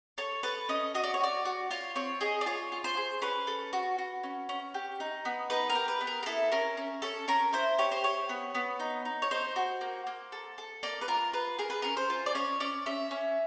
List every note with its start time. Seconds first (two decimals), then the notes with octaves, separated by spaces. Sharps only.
0.18 A4 C#5
0.43 A4 B4
0.69 C#4 D#5
0.94 F#4 D#5
1.04 D5
1.14 C#5
1.20 F#4 D5
1.45 F#4
1.71 F4 C#5
1.95 C4 C#5
2.21 G#4 D#5
2.41 D5
2.46 F4 C#5
2.72 F4
2.84 C5
2.97 G#4
3.22 C#4 B4
3.47 A4
3.73 F#4
3.98 F#4
4.23 C#4
4.49 C#4
4.74 G4
5.00 D#4
5.25 B3
5.50 D#4 B4
5.70 A#4
5.75 G4
5.88 B4
6.01 B3
6.07 A#4
6.23 A#4
6.26 E4 A4
6.52 C#4 A#4
6.77 C#4
7.02 C#4 A4
7.28 C#4 A#4
7.53 E4 C5
7.78 G4 C#5
7.92 C5
8.04 G4 C#5
8.29 B3
8.55 B3
8.80 D#4
9.05 D#4
9.22 C#5
9.31 D#4 C5
9.56 F#4
9.81 A#3
10.07 A#3
10.32 A4
10.58 A4
10.83 A#3 D5
11.01 B4
11.08 F4 A#4
11.33 F4 B4
11.59 G#4 A#4
11.70 B4
11.82 C#4 A#4
11.97 C5
12.10 F4
12.26 D5
12.35 C#4 C#5
12.60 C#4 D5
12.86 C#4 E5
13.11 C#4